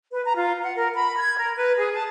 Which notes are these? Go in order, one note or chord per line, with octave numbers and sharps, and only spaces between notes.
B4
A#5
F4
F#5
A#4
B5
G#6
A#4
B4
G#4
A5